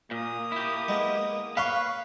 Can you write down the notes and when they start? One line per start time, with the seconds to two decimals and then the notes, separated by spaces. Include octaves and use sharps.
0.11 A#2 A#3 D#6
0.52 E4 G4
0.88 G#3 B3
1.57 B4 C#5 F5 C6 C#6